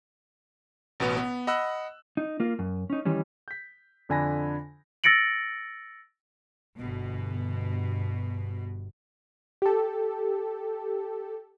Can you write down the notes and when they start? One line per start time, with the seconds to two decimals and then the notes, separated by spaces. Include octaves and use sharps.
1.00 A1 B2 B3
1.17 B3
1.47 D#5 F#5 B5 E6 F#6
2.17 D#4
2.40 A#3 F4
2.59 F#2
2.90 C#4 D#4
3.05 D#3 E3 G3 C#4
3.48 G6 B6
4.09 F2 D3 D4 G#5 B5 A#6
5.04 E6 A6 A#6 C#7 D7 F#7
6.77 G1 B2
9.62 G4 A4